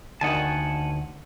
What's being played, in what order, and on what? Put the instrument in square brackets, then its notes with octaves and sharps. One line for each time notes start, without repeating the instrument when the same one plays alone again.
[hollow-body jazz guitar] D2 D#3 D#5 [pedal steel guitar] F#5 G#5 A5